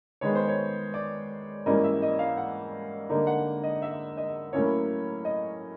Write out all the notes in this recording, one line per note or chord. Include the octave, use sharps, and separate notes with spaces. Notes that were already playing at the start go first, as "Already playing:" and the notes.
D#3 G#3 B3 C#5
C5
C#5
D5
G#2 E3 G3 A#3 C#4 D#5
E5
D#5
F5
F#5
D3 G3 A#3 D#4
F#5
D#5
E5
D#5
A2 F#3 A#3 C#4 E4 C#5
D#5